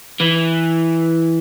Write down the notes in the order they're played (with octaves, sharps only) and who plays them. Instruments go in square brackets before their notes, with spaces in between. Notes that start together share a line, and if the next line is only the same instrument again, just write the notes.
[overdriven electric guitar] E3